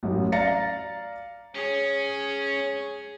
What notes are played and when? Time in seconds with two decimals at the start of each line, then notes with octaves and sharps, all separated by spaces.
0.03 A1 F#2
0.32 D5 F5 A#5 A6 A#6 C#7
1.55 C#4 G#4 C#5